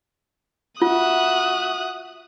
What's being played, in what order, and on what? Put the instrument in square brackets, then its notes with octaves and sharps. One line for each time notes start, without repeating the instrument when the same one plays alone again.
[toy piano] F4 [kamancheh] F#4 E5 [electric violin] D#6 F#6